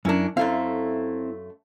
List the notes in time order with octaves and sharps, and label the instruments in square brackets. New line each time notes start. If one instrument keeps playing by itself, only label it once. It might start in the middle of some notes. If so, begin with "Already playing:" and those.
[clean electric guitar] F#2 E4 A#4 [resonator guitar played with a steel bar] C#4 D4
[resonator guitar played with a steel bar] F#2 A3 F5 [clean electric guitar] C4 E4